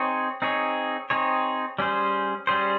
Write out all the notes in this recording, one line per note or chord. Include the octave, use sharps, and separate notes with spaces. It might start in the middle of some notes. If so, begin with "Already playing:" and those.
Already playing: C4 D#4 G#4 C#5
C4 D#4 G#4 C#5
C4 D#4 G#4 C#5
G3 C#4 G#4 C5
G3 C#4 G#4 C5